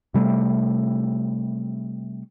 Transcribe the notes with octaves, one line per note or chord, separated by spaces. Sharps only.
C3 G3 A3